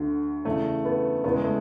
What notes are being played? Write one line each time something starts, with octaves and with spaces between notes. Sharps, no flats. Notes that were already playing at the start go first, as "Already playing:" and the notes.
Already playing: D2 D3 F#4
E2 C#3 E3 A3
B3
E2 C#3 E3 B3
G#3
A3